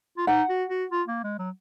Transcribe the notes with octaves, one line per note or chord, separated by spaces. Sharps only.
F4
D#4 F#5
F#4
F#4
F4
A#3
G#3
F#3